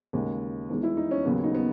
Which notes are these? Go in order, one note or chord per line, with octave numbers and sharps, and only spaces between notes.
D#2 C#3 G#3
E2 D#3 G#3
E4
D#4
C#4
D#2 C#3 F#3 B3
D#4
B3